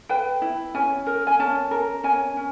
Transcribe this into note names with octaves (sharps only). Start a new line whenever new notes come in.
B4 G5
E4
C#4 G#5
A#4
G#5
C#4 A5
A#4
C#4 G#5
C#4